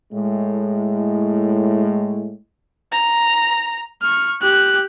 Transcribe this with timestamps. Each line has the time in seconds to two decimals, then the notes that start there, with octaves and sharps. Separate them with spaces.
0.13 A2 G#3
2.92 A#5
4.02 C#6 F6
4.42 G4 F#6